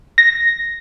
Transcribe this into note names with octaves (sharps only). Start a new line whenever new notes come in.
A#6